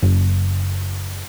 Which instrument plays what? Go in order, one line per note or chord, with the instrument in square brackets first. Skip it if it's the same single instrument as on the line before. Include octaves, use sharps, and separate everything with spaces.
[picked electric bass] F#1